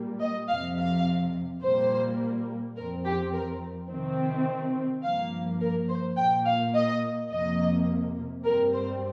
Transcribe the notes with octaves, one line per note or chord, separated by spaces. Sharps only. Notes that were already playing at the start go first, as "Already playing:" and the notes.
Already playing: A#2 G3 A#3
D#5
F2 C3 F3 F5
F5
A#2 G3 A#3 C5
F2 F3 C4 A#4
G4
A#4
C3 D#3 C4
G2 F3 A#3 F5
A#4
C5
A#2 A#3 G5
F5
D#5
F2 C3 F3 A#3 D#5
G2 G3 C4 A#4
C5